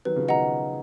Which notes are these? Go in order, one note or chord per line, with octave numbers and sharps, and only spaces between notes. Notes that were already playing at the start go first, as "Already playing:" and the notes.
D#3 F#3 B4
C#3 F3
B2 D#3 D#5 F#5 A#5